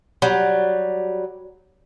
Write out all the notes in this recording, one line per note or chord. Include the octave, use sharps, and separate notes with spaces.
F#3 G3